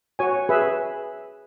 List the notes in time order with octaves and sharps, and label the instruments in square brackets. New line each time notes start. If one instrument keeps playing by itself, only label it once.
[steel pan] F#4 C#5 G#5
G#4 B4 E5